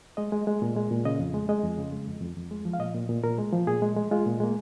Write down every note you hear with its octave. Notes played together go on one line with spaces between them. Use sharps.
G#3 D#5
G#3
G#3
A#2
G#3
A#2
C#3 D#5
F2
G#3
G#3 D#5
F2
C#3
G#3
F2
F2
F2
G#3
F3
F5
A#2 D#5
A#2
A#2
A#2 A#4
G#3
F3
A#2 G#4
G#3
G#3
G#3 F4
A#2
G#3 A#3